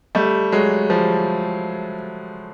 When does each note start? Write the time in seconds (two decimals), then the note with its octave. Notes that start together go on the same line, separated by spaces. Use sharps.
0.15 G3 A3
0.52 F#3 G#3
0.90 F3 G3